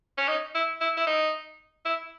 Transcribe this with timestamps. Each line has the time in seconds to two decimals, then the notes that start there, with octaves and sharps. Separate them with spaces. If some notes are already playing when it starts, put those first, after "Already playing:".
0.18 C#4
0.29 D#4
0.55 E4
0.81 E4
0.97 E4
1.07 D#4
1.86 E4